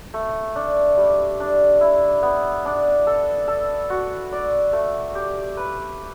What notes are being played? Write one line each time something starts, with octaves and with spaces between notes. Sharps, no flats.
A3
D4
G3
D4
E4
B3
D4
A4
A4
F#4
D5
A3
G4
B4